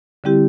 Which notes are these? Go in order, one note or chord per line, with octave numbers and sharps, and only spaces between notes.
D3 G3 C4 E4 G4